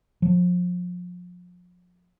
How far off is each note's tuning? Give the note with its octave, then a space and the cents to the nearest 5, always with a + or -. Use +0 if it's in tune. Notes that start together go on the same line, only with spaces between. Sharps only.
F3 +35